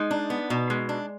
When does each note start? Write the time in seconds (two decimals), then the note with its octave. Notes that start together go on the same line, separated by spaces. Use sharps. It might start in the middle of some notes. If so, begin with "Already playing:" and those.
Already playing: G#3 D#4
0.11 D4
0.30 B3
0.50 B2
0.70 G#3
0.89 D4